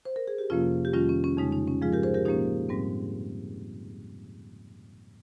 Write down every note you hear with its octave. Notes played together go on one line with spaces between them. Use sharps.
C5
A#4
G#4
G4
F2 C3 F3 A#3 C#4 F4
G4
F2 D#3 G3 C#4 F4
C#4
C#4
F2 C#3 G#3 D#4
D#4
C#4
G#2 F3 G#3 F4 G#4
G4 A#4
G#4 C5
G4 A#4
A#2 F3 A#3 C#4 D#4 G4
G#2 G3 C4